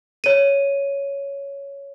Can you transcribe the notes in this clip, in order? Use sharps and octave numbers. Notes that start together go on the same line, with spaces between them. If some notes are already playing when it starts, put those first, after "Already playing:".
C#5 D#7